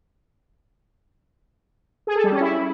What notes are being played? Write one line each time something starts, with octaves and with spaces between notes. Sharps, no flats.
G#4
A4
G3
C#4
E4